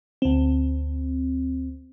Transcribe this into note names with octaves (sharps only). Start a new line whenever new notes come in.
D2 C4